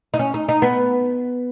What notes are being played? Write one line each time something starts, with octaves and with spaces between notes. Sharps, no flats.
D#4
C#4
D#4
D#4
B3